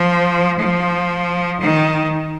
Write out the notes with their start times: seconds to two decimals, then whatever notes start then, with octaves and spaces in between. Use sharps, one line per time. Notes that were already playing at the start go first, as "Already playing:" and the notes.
Already playing: F3
0.60 F3
1.61 D#3